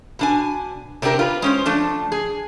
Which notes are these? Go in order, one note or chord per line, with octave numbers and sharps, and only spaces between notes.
B2 D4 G#5
C3 C4 D4 G4 A#4
F4 B4
G#3 C#4 C5
F3 A3 D4
G#4